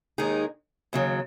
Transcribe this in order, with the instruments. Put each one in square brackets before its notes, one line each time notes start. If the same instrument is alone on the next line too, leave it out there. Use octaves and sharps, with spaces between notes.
[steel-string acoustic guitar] D#2 D#3 G#3 D#4 G#4
D#2 C#3 F#3